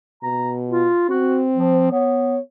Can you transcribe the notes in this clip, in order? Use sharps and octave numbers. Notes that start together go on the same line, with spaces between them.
B2 A#5
F4
C4 F#4
F3
B3 C#5